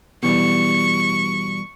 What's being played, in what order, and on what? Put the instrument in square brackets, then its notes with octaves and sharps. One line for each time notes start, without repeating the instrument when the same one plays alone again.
[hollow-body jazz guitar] B2 E3 G3 [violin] C#6